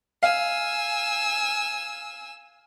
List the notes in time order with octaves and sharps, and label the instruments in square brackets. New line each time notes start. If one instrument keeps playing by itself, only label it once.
[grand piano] F5 [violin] G#5 E6